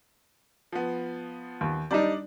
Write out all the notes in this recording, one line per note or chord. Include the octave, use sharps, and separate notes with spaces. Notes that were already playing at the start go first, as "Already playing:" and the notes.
F3 B3
D#2
G3 D4 D#4 D5